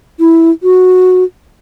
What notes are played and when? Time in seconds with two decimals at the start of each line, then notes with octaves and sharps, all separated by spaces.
0.20 E4
0.63 F#4